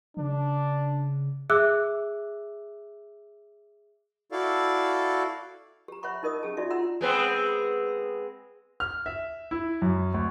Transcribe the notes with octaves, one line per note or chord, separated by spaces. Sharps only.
C#3 D4
G#4 E5 D6 E6 F#6
E4 F#4 A4 D5 F5
G4 A#5
C#5 E5 F#5 B5 C#6
D#4 A#4 D#5 D#6
C#4 G4 G#4 A5
D4 D#4 F4 F#4 D5 E5
D#4 F4 F#5 A#5 C6 E6
G#3 B3 C4
F6
E5
E4
F#2
D2